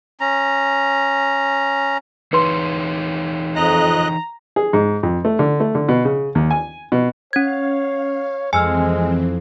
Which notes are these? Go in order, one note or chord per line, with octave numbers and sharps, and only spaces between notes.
C#4 A#5
E3 D#4 B4 C#5 C6
F2 D#5 A#5 F#6
G#4
G#2
F2
A3
D3
A3
D3
B2
C#3
D#2
G#5
B2
C#4 C#5 F5 G#6
F2 E3 G#3 C4 G#5 E6 F6